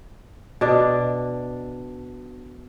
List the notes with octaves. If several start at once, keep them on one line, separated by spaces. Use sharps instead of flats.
B2 D4